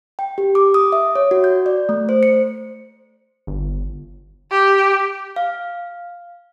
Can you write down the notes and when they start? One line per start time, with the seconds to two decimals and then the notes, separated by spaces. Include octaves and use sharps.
0.19 G5
0.38 G4
0.55 D6
0.74 D#6
0.92 E5
1.15 C#5
1.31 F#4
1.44 G6
1.66 D5
1.89 A3
2.09 C5
2.23 C#7
3.47 G1
4.51 G4
5.36 F5